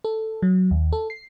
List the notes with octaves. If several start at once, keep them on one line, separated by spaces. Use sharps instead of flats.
A4
F#3
D#2
A4
C7